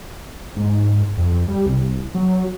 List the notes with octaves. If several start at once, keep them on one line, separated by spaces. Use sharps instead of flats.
G#2
F2
G3
C2
F#3